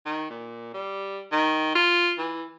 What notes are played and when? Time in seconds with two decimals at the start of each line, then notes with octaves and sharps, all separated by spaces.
0.05 D#3
0.30 A#2
0.74 G3
1.32 D#3
1.75 F4
2.18 E3